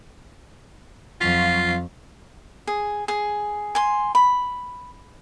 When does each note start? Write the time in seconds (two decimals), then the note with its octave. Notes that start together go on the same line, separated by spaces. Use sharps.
1.21 F2 F#3 F4 F5 C#6
2.67 G#4
3.08 G#4
3.75 G#5 C6
4.15 B5